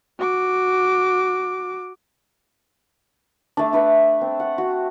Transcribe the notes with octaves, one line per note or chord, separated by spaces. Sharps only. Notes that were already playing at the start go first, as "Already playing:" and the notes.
F#4 D6
A3 D4
D4 B4 E5
C4
F#5
F#4